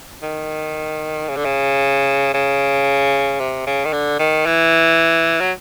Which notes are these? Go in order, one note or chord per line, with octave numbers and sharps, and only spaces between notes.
D#3
C#3
D3
C#3
C#3
C3
C#3
D#3
D3
D#3
E3
F#3